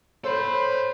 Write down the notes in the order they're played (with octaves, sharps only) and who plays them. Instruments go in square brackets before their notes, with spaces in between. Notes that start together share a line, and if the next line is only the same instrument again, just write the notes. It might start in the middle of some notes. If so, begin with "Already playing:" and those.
[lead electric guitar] A4 B5 [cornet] C5 [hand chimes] C#5